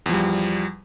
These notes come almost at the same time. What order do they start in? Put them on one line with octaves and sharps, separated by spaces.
E2 F3 G3